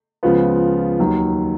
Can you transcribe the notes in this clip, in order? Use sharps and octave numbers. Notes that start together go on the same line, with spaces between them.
C#2 C#3 F3 B3 F4
D#2 D#3 F#3